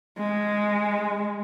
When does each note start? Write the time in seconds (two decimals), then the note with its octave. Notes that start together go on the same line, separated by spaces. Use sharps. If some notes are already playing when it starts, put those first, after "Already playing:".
0.18 G#3